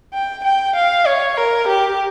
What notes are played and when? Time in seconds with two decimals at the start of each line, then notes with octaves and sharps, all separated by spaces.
0.13 G5
0.44 G5
0.76 F5
1.06 C#5
1.37 A#4
1.68 G4